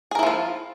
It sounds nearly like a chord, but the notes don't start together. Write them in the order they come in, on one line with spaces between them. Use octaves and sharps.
G#4 A#4 E4 F3 F4